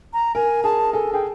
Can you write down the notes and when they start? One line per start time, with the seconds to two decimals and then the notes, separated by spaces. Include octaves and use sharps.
0.13 A#5
0.35 A#4 G#5
0.64 G#4 A5
0.93 A4 G#5
1.13 G#4 G5